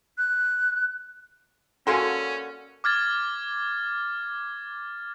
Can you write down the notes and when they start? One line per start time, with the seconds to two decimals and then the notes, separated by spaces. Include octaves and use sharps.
0.18 F#6
1.87 D3 A#3 C#4 F#4 A4 G#5 C6
2.84 D6 F6 G#6 A6